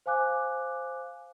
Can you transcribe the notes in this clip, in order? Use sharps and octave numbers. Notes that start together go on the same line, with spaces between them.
C5 F5 G#5 D6 F#6